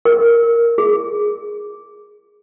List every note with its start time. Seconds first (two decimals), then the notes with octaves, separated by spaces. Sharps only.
0.05 A#4
0.78 G#4